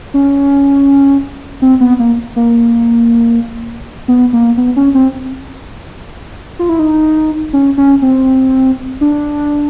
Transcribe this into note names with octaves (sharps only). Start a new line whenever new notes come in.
C#4
C4
B3
A#3
A#3
B3
A#3
B3
C#4
C4
F4
E4
D#4
C#4
C#4
C4
D4